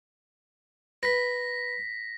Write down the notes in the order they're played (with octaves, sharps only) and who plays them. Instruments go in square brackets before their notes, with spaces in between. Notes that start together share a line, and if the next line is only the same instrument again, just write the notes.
[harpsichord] B4 [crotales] A#6 B6